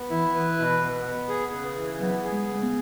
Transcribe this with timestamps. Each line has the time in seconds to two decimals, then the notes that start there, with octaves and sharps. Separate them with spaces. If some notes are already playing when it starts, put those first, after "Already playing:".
Already playing: B3
0.10 E3 E4
0.35 E3 B4
0.58 B2
0.82 B3
1.06 B3
1.29 G#4
1.52 C#3
1.76 E3
1.99 F#3 B3
2.24 G#4
2.31 G#3
2.47 C#3
2.53 G#3
2.63 B3